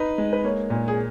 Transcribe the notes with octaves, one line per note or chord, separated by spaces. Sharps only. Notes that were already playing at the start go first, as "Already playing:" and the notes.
Already playing: D#4 B4
G#3
B4
A#3 C#5
A#2
G#4